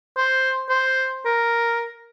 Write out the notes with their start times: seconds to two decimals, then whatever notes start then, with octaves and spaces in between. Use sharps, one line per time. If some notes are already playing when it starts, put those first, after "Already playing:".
0.17 C5
0.69 C5
1.25 A#4